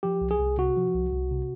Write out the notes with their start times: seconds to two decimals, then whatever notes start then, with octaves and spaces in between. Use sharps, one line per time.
0.03 F3 G4
0.21 C2
0.31 G#4
0.40 C2
0.58 C3 F#4
0.77 F3
0.94 C2
1.12 C2
1.31 C3